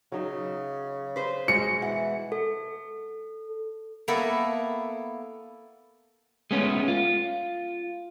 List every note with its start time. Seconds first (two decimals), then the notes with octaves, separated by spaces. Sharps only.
0.12 C#3 F#3 D#4 E5
1.16 B4 C5
1.48 B2 G#3 C#7
1.82 E3 F#5
2.32 A4
4.08 A#3 B3 E4 A4 A#4
6.51 G#3 A3 B3 C#4
6.88 F4